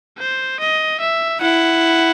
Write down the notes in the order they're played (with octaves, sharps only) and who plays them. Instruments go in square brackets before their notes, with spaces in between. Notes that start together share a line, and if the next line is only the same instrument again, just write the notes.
[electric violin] C5
D#5
E5
[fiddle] E4 [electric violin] F#5